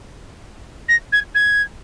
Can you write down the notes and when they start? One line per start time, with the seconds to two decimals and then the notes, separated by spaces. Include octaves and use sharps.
0.89 A#6
1.12 G#6
1.35 G#6